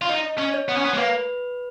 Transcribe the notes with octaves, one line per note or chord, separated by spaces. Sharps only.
F4
D#4 D#5
C#4
C#5
B3
C#4
B3
G#3
A#3 B4